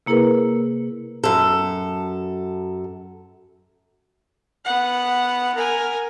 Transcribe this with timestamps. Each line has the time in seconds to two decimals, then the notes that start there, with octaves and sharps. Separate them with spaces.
0.06 C3 A#3 E4 G#4 A#4 B4
1.24 F#2 A4
4.65 B3 F#5
5.55 A#4 G#5